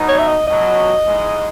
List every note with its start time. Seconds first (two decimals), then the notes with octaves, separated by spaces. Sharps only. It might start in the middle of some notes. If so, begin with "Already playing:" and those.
Already playing: B2 F#3 B3 D#4
0.09 C#5
0.19 E5
0.28 D#5
0.46 C#2 B2 F#3 D#5
1.04 G#2 E3 G#3 D#4